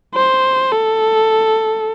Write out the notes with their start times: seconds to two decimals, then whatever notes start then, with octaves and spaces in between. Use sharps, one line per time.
0.15 C5
0.73 A4